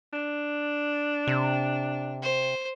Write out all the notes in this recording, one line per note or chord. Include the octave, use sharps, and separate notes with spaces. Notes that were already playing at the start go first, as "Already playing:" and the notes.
D4
C3
C5